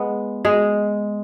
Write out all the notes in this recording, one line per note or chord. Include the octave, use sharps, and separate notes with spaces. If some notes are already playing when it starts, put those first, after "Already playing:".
Already playing: G#3 B3 G#4 B4
G#3 G#4